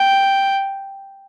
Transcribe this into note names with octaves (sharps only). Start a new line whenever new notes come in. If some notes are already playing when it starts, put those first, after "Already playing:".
Already playing: G5